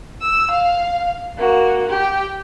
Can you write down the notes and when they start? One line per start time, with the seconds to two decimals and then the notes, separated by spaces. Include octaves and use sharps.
0.21 E6
0.51 F5
1.38 A#3 F#4
1.89 G4